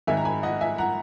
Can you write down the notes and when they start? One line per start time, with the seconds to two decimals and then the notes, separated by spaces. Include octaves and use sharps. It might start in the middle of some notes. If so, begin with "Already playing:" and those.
0.07 G#1 G#2 D#3 E5 G#5
0.17 A#5
0.25 G#5 B5
0.43 D#5 F#5
0.61 E5 G#5
0.78 F#5 A#5